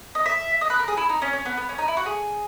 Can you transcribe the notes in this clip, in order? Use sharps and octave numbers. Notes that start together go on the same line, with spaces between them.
D#5
E5
D#5
B4
A#4
G#4
E4
D#4
C#4
C#4
B3
B3
C#4
D#4
E4
F#4
G#4